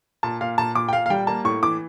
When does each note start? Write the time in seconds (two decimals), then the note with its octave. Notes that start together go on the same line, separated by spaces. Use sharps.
0.23 A#2 A5
0.41 A#2 F5
0.58 A#2 A5
0.75 A#2 D6
0.89 G5
0.93 A#2 F5
1.06 F5
1.10 G3 G5
1.27 A#3 A5
1.45 A2 C#6
1.62 E3 D6